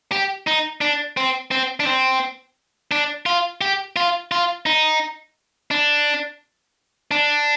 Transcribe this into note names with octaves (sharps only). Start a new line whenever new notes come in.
G4
D#4
D4
C4
C4
D4
C4
D4
F4
G4
F4
F4
D#4
D4
D4